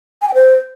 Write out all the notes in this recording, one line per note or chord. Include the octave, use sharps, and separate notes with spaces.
G#5
G5
C5